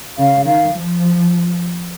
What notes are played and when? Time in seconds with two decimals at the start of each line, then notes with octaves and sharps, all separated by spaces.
0.17 C#3 F5
0.46 D#3 F5
0.75 F3